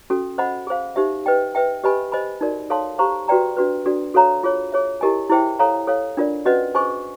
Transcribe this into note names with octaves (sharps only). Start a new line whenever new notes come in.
C#4 F#4 A4
C5 D#5 F#5 B5
G#4 C5 F5
D#4 G4 C5 E5
B4 D#5 G5
B4 E5 G5
G4 B4 D#5 G#5 B5
C5 D#5 G#5 B5
D#4 F#4 A#4 D5
A4 C#5 F5 A5 C6
G4 C5 F5 A#5 C#6
F#4 B4 D5 G5 A#5
D4 F#4 B4
D4 F#4 A4 D5
F#4 A4 C#5 F5 A#5
F4 G#4 C#5
G#4 C#5 E5
E4 G4 A#4 D#5 G#5
E4 G#4 C5 E5 G5
A4 C#5 F5 A#5
A4 C#5 F5
D4 F4 A#4 D5
C#4 F#4 B4 D#5 F#5
G#4 C5 D#5 G#5 C#6